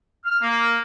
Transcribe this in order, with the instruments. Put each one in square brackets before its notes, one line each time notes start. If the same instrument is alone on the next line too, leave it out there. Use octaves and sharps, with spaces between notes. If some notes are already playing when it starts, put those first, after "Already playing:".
[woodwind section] F6
A#3